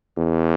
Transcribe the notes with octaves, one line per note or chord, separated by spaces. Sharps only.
E2